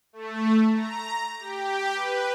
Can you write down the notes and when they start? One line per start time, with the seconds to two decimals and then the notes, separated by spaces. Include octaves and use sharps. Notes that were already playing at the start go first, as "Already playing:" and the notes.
0.13 A3
0.73 A#5
1.39 G4
1.94 B4